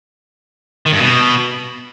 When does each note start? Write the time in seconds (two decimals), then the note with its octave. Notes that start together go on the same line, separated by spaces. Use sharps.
0.86 D#3
0.93 G2
1.00 B2